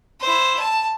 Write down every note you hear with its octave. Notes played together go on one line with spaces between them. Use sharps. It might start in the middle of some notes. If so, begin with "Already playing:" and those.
E4 C5
A5